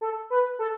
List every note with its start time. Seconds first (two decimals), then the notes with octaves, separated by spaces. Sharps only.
0.01 A4
0.30 B4
0.59 A4